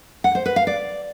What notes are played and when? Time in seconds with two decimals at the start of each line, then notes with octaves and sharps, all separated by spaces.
0.24 F#5
0.35 C5
0.46 B4
0.56 F5
0.67 D5